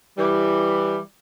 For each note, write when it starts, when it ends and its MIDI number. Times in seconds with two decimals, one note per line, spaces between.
0.17 0.98 52
0.17 0.98 55